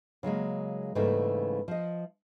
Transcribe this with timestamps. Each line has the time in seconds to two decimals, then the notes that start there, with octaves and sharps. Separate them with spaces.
0.23 C#3 F#3 G#3 A#3
0.95 G#2 C#3 E3 G3 A3 A#3
1.68 F3 D#5